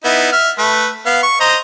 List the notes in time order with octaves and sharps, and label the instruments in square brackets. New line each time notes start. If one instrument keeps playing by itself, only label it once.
[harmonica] B3 D#4 E4
E5 F6
A3 B4
B3 F5
C#6
C5 D#5 A#5